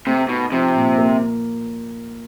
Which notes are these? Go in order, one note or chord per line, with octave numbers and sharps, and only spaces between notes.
C3 A3
B2 D#4
C3 F3
A#2
A#3